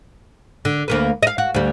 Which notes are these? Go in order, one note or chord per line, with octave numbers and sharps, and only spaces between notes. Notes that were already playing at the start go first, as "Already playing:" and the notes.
D3
D2 A#3 B4
D#5 F5
F#4
D2 G3